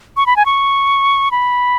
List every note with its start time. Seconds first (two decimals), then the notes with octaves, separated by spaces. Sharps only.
0.17 C#6
0.26 B5
0.36 G#5
0.46 C#6
1.31 B5